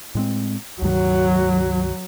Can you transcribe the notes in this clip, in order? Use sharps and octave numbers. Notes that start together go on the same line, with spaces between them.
A2 G#3 C4
C#2 G2 D#3 F#3